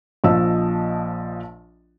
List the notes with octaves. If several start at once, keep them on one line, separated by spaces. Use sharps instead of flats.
A#1 F3 D#5 A5 E6